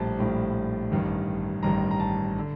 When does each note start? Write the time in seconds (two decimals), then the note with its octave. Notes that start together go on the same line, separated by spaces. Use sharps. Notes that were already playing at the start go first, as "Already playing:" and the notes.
Already playing: A#1 A2 G3 A5
0.19 A#1 A2 G3
0.91 A1 G2 D#3 G3
1.63 A1 G2 D#3 G3 A#5
1.91 A#5
2.00 A5
2.39 D3